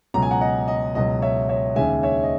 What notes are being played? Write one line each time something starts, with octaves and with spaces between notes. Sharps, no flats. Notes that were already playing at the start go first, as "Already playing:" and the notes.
C#2 B2 F#3 A#5
G#5
F#5 A#5
D#5 F#5
D#5
C#2 B2 F#3 D#5
C#5 E5
C#5 E5
D#2 C#3 G#3 E5 G#5
C#5 E5
D#5